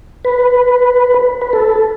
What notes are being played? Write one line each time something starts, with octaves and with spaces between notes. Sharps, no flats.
B4
B4
A4